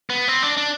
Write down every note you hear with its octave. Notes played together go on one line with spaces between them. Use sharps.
B3
C4
D4
D4